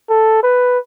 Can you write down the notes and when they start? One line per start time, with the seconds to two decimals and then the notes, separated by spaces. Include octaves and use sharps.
0.09 A4
0.43 B4